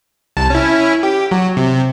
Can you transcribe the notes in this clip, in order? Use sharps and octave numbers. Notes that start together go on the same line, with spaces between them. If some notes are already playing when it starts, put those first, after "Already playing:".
C2 A5
C#4 E4
G4
F#3
C3